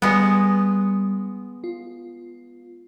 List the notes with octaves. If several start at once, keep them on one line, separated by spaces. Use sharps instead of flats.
G3 G#3 B3
F4